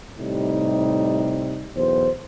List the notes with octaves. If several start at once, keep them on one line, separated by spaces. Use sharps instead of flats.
A2 C3 G3 D#4
B1 E2 C5